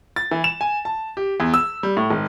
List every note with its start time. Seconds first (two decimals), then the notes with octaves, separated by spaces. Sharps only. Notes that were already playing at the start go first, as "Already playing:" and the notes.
0.16 A6
0.31 E3
0.44 E7
0.61 G#5
0.85 A5
1.17 G4
1.40 E2
1.54 E6
1.83 G3
1.97 A2
2.11 G#1